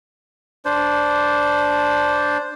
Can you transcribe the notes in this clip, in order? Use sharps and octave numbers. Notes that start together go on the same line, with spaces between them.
D4 C5